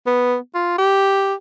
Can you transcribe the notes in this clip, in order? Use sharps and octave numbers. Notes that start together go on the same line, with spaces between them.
B3
F4
G4